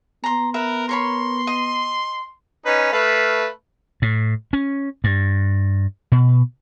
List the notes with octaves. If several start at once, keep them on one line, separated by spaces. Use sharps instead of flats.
B3 A#5 C6
A#4 B4 E5
A#4 C#5 B5 C6
D#5
C#4 D#4 B4
A3 B4 F5
A2
C#4
G2
B2